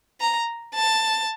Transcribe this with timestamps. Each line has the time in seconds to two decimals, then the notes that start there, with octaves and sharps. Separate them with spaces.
0.21 A#5
0.75 A5